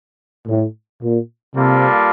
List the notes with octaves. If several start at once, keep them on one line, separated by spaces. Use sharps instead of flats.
A2
A#2
C3 G3 A#3 F4 A4